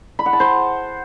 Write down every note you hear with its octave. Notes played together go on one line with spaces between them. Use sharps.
B5
F#5
A5
C5